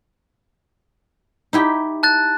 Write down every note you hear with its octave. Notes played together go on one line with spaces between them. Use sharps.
D#4 E4 G4
A5 F#6 A6